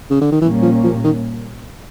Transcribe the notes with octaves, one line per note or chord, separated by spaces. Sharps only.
C#3
D3
D#3
A#2 E3 G3 A#3 C#4
F3
F3
D#3